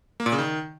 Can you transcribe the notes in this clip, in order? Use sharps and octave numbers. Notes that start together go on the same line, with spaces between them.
A#3
A#2
C#3
D#3